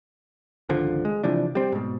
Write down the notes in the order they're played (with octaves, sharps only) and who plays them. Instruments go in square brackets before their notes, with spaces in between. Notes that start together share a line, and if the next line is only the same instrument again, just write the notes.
[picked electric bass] G#1 C#2 D3 F3
G#3
C3 E3 F3 D4
G3 C4
G#2 B2